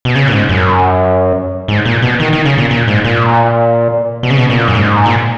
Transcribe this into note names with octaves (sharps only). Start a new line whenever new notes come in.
B2
C#3
A#2
G#2
F#2
G#2
A#2
B2
D#3
D#3
C#3
A#2
A#2
G#2
A#2
B2
C#3
B2
A#2
F#2
G#2
A#2